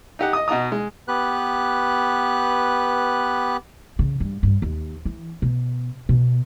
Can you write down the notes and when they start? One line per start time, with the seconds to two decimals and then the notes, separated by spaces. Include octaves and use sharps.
0.19 D#4 G4 F#5
0.33 D#5 D#6
0.48 B2 F#4 D#5 A#5 D#6
0.72 G#3
1.08 B3 G4 B4 F#6
3.99 C#3
4.20 G2
4.43 G2
4.62 D#2
5.05 E3
5.42 B2
6.09 B2